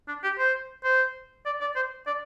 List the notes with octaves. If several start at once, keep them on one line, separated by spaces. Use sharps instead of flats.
D4
G4
C5
C5
D5
D5
C5
D5